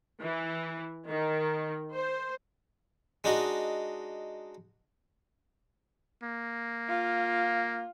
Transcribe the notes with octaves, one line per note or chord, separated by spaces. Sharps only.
E3
D#3
C5
G#3 D4 D#4 F#4
A#3
F4